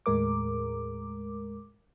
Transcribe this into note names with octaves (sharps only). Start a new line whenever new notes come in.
D#2 A2 G#3 A#4 D6